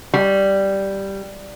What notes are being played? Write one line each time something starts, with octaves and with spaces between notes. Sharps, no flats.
G3